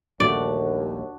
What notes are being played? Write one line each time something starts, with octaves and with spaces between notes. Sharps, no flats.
D#1 A#1 D#2 A3 D4 F#4 D5